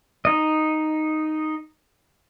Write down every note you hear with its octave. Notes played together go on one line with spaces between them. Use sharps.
D#4 D#5